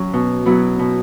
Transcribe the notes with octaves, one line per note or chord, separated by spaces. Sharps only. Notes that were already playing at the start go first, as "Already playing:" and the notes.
Already playing: F#3 C#4
B2
F#3 B3 E4
B2